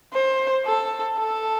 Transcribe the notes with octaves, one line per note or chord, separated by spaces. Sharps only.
C5
A4
A4